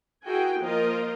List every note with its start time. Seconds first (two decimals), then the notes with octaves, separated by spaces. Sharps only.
0.25 E4 F#4 G#4 A#4 G5 G#5
0.60 F3 A#3 F4 A#4 C5 D#5